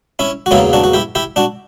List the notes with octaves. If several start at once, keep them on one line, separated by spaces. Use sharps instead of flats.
C#4 E4
F#4
E2 C#3 F#3 A#3 C#4 E4
D4 F#4
F#4
E4 G4
E4 G4
D4 F#4